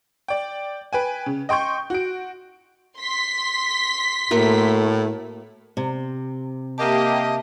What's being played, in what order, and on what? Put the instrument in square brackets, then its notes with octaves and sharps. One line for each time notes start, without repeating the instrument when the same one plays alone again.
[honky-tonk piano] D5 G5
B4 G5 G#5
C#3
D#5 G5 C6 C#6 G6
F#4 D7
[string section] C6 B6
[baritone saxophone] A2 [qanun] A3 A#3 F#4
[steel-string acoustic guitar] C3
[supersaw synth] A#3 G4 [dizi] D#5 [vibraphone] E5 A5